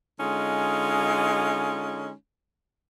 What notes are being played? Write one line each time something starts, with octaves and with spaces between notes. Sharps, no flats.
D3 G#3 C#4 D#4 F4